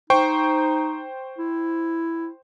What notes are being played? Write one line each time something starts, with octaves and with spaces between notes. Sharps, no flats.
D#4 C5 G5 C#6
E4